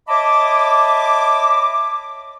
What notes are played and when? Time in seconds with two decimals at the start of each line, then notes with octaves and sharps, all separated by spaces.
0.08 C#5 D#5 E5 A5 B5 D6